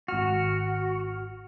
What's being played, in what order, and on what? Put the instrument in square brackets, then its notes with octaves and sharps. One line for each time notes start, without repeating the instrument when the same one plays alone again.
[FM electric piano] G#1 F6 [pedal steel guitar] F#4